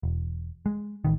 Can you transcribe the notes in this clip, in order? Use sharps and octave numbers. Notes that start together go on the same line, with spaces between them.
E1
G#3
A1 D#3